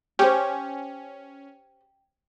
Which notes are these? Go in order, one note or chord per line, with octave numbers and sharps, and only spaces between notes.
C#4 G4 C5 G5